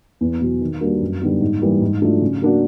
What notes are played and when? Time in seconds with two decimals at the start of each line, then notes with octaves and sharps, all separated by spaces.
0.21 E2
0.41 B2 F#3
0.61 D#3
0.81 G3 A#3 D4 F#4
1.01 F#2
1.21 D3 G3 B3 D#4
1.41 G#2
1.61 E3 G3 A#3
1.81 G#2
2.01 F3 A3 D4 F#4
2.21 C#3
2.42 F#3 A#3 D4 F#4